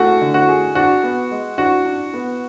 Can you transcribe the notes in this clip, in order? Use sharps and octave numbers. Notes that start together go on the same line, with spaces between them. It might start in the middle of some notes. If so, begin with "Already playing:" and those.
Already playing: A3 F#4 G#4
D3
F#4
G#4
D4 F#4
B3
G#3
D4 F#4
D4
B3